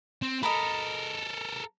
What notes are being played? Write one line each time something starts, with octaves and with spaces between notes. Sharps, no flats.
C4
A4 A#4 D#5 A#5 B5